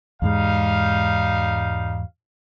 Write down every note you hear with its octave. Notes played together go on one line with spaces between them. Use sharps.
E2 G#2 G3 G#3 D#4 F5